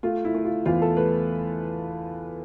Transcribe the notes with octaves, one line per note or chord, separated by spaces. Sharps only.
A3 F4
E4
A3
F4
E2 F4
A4
A3 B4